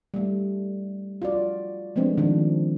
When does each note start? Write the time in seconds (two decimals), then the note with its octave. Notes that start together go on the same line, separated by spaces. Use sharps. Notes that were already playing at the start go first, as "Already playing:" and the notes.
0.14 G3 A3
1.22 F4 F#4 D5
1.96 F3 G#3 A3 B3 C4 D4
2.18 D#3 F3 D4